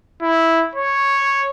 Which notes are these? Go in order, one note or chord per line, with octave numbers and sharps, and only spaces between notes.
E4
C#5